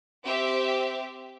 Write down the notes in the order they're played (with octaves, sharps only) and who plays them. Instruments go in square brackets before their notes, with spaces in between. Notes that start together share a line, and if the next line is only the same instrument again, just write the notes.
[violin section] C4 G4 E5